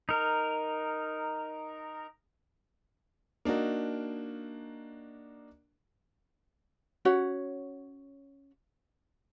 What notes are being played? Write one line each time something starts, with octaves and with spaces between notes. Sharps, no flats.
D#4 A#4
A#3 D4 D#4 F#4 A#4
C#4 F#4 C#5 F#5